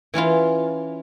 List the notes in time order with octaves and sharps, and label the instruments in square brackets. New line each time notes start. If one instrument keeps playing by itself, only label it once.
[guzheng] E3 C#4 E4 F4